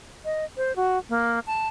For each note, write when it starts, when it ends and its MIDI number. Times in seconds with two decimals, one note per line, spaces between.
0.25 0.45 75
0.57 0.75 72
0.76 0.98 66
1.09 1.39 58
1.47 1.68 81